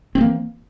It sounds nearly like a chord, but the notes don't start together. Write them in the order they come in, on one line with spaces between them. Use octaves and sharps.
C4 G#3 A#3 E3